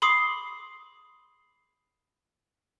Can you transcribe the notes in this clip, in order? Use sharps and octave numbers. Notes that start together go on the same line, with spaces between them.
B5 C6 D6 D#6 C7